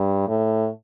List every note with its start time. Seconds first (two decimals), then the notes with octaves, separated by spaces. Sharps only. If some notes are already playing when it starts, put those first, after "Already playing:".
Already playing: G2
0.28 A2